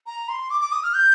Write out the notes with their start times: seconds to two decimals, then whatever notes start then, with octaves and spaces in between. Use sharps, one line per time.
0.06 A#5
0.28 C6
0.50 D6
0.61 D6
0.72 D#6
0.83 F6
0.94 G6